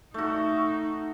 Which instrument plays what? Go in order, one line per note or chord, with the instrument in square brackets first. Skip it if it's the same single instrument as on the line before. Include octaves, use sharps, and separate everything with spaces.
[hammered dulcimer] A3 F#4 [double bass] D#4